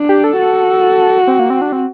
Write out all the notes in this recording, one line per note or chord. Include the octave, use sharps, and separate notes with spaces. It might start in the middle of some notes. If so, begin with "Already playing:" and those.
Already playing: D4
G4
A4
F#4
C4
A#3
C4
D4
C4